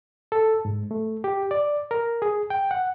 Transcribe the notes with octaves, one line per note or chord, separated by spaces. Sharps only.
A4
G#2
A3
G4
D5
A#4
G#4
G5
F#5